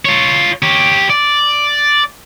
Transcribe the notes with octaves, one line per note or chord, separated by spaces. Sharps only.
F4 C#5
G4 C#5
D5